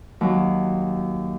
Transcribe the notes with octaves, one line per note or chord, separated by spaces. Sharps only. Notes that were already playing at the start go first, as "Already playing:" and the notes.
D#2 F#3